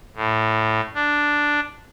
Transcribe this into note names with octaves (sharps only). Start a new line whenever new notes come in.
A2
D4